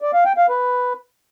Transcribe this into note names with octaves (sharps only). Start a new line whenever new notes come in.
D5
F5
G5
F5
B4